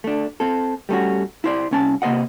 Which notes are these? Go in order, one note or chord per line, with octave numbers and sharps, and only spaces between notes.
A3 D4
C4 A4
G3 A3 C#4 F#4
E4 C5 D5
C2 C#4 A5
C3 A#3 C5 D#5 F#5